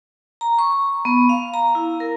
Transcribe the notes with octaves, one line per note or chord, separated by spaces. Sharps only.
A#5
C#6
B3
F5
A#5
E4
A#4